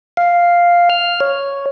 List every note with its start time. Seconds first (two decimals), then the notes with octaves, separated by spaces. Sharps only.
0.17 F5
0.90 F6
1.20 C#5